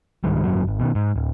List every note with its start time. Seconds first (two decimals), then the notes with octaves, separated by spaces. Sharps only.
0.24 C#2 G#2 D#3 G3
0.44 G#1 F#2 A#2 F#3
0.67 G#1
0.80 B2 D#3
0.95 G#2
1.16 D1